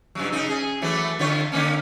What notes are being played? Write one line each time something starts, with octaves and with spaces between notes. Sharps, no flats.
G2 C#3 F#3
C#3 D#4
G#4
E3 F#3 A3
D3 F4 C#5
D3 A#3 C#4